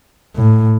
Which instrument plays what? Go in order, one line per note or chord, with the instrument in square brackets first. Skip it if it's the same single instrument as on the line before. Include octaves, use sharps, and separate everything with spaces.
[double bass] A2